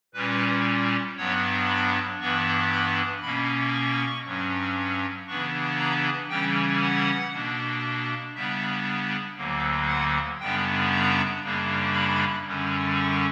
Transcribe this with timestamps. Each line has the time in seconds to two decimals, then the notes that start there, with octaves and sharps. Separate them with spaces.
0.14 A#2 G3 C#4 B4
1.17 G2 F#3 B3 D4 C#5
1.68 B5
2.20 G2 E3 B3 D4 C#6
2.70 B5
3.22 B2 A#3 C#4 B5
3.73 C#6
4.24 G2 F#3 C#4
5.27 C#3 E3 B3 D4 C#6
5.78 A#5
6.29 C#3 E3 G3 C#4 G5
6.81 F#5
7.32 B2 A#3 D4
8.34 C#3 G3 B3 D4 E5
9.37 D2 D3 F#3 A#3
9.88 F#5
10.39 F#2 C#3 G3 B3 D4 G5
10.92 A#5
11.42 F#2 C#3 G3 A#3 D4
11.93 B5
12.44 F#2 D3 G3 C#4
12.96 C#6